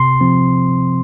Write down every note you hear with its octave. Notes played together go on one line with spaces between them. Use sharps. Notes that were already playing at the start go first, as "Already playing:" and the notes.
Already playing: C3 C6
F3 C4